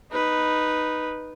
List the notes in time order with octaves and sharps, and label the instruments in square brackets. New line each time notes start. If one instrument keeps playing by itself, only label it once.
[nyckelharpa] D#4 B4